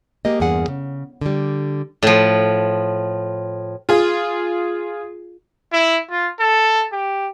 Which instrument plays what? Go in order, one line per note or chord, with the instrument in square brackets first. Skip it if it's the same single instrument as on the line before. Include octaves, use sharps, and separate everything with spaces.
[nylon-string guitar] G#3 A#3 G4 D#5
E2 G2 A#3 G#4 F#5
C#3
D3 G3
[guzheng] A2 F3
[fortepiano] F4 G#4
[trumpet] E4
F4
A4
G4